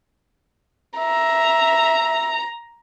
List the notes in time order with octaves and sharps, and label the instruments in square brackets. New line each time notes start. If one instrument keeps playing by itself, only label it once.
[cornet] E5 [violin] A#5